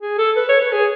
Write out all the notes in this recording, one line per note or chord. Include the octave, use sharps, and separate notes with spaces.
G#4
A4
B4
C#5
B4
G#4